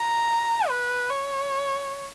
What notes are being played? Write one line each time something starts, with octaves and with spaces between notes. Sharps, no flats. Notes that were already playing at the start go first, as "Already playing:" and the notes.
Already playing: A#5
B4
C#5